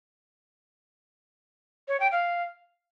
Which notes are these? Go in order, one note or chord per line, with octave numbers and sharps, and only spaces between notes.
C#5
G5
F5